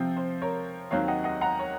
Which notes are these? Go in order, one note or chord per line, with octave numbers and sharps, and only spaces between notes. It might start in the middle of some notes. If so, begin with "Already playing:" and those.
Already playing: C3 F3 C4
C5
A#4 C#5
D#2 D#3 F#3 C4 C#5 F5
D#5 F#5
D#5 F#5
F#5 A#5
C#5